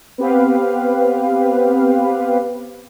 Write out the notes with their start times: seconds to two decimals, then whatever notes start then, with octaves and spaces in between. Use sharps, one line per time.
0.18 B3 C4 G4 B4 F5